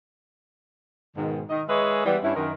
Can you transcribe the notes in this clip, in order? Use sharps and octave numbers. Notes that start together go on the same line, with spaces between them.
G#2 B2 D#3
D#3 D#5
G#3 G#4 B4 C#5 D#5 E5
E3 G3 B3
G2 C#4 E4
F#2 D#3 A#4